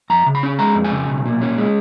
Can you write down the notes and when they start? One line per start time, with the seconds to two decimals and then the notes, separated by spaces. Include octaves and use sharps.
0.10 F2 A#5
0.26 C#3
0.35 B5
0.43 C#4
0.59 G#3 A#5
0.75 F2
0.84 G#5
0.92 C#3
1.09 B1
1.26 A#2
1.41 C#4
1.58 G#3